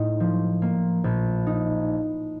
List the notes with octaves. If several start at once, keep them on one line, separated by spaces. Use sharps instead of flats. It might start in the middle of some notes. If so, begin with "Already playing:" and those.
Already playing: A2 D#4
F3
A#3
A#1
D#4